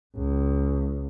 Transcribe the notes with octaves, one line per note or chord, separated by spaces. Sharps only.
C#2